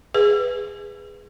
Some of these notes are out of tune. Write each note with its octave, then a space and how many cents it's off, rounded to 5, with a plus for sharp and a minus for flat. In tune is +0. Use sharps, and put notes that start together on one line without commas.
G#4 -10 B4 +0